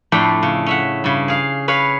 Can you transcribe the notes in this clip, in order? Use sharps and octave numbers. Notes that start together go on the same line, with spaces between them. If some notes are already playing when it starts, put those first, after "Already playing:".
F2 A2 A3 D4 G5 C6
C#3
C#4 E5 F#5
G2 C#3
G#4 F5
B4 C#5 F5 B5